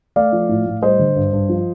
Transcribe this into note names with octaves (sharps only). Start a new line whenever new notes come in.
A3 D5 F5
F3
A2
A2
G3 C5 D#5
D3
G2
G2
F3